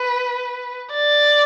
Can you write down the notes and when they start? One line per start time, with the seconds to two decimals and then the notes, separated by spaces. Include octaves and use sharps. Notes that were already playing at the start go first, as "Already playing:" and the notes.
Already playing: B4
0.94 D5